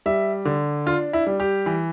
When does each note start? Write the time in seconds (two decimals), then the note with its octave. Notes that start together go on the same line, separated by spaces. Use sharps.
0.06 G3 E5
0.45 D3
0.86 D4 F4
1.13 E4
1.27 G3
1.40 G4
1.66 E3